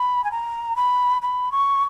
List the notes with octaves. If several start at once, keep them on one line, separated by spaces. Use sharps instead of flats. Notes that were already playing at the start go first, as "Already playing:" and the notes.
Already playing: B5
G#5
A#5
B5
B5
C#6